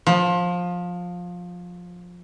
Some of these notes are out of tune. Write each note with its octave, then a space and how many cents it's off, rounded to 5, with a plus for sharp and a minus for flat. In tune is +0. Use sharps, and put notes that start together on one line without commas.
F3 +20